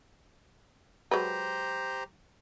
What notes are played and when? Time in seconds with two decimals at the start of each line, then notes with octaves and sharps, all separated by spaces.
1.11 F#3 G#3 G4 B4 C5 A#5